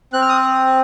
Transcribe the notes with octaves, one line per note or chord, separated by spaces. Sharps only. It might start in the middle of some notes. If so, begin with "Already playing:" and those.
C4 F#6
F6
D#6